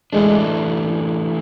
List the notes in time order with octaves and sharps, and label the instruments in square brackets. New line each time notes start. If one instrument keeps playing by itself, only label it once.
[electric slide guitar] E3 A3 D4 [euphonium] G#3